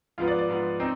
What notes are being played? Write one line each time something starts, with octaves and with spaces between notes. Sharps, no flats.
G#2 F3 B3 F4
D5
D5
G#2 F3 B3
C4 D#4